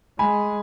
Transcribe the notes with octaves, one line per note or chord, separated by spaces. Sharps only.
G#3 G#5 B5